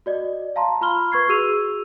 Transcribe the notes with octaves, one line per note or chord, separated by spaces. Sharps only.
F#4 D5 D#5
F5 A5 A#5 C6
F4 B5 C6 F6 G7
B4 C#6 G#6 C7
F#4 G#4 E6 D#7 F7